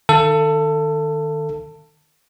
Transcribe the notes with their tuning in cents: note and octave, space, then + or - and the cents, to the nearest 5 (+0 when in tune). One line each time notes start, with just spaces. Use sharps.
D#3 -25 A4 +20 F5 -45